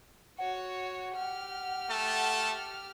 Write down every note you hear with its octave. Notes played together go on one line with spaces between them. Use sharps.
F#4 C#5 F#5
G4 F6
A3 A4 A5